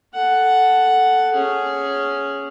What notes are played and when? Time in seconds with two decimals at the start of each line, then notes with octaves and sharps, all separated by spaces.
0.15 A4 F#5
1.33 C#4 G#4